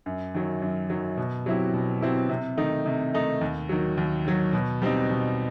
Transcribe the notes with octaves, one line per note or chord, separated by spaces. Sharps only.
F#2
D#3 F#3
F#2
D#3 F#3
B2
F#3 C4 E4 G4
B2
F#3 C4 E4 G4
C3
D#3 A3 D#4
C3
D#3 A3 D#4
D#2
D#3 F#3
D#2
D#3 F#3
B2
G3 C4 D#4
B2